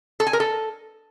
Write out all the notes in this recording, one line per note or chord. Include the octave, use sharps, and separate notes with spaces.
A4
G#5
A#4
A4